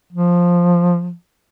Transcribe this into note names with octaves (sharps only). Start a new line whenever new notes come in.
F3